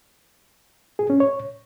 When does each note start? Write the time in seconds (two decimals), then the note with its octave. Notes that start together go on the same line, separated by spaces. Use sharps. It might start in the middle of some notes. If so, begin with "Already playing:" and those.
0.99 G#4
1.10 C#4
1.20 C#5